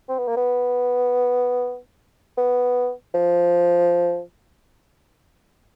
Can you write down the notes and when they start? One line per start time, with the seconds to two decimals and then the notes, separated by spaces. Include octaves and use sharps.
0.09 C4
0.18 B3
0.28 A#3
0.37 B3
2.37 B3
3.14 F3